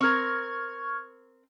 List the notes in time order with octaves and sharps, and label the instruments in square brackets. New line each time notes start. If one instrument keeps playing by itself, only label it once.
[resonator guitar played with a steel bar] C4 A#4 [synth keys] C#6 F6 G#6